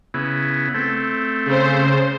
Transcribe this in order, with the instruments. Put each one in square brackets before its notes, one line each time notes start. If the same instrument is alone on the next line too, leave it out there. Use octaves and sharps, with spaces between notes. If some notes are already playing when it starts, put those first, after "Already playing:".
[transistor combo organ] C#3 B3 E4
A3 C4
[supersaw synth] C#3 C5